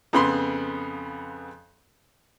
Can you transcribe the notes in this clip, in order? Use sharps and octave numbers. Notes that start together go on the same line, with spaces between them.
F2 C#3 B3 B5 C6